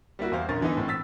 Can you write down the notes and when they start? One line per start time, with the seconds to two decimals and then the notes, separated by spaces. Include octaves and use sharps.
0.19 G3 A#3 E4 F#4
0.32 E2 C5 F5
0.48 A#1 D3 C#4 A#4 A6
0.61 D3 E3 B3 D#4
0.77 A2 C4
0.88 E6 A6 B6